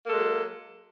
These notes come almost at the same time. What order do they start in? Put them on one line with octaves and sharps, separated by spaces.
A#3 A4 G#3 F#3